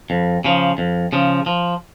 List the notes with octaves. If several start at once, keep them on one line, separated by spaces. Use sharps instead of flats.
F2
C#3 F3
F2
C#3 F3
F3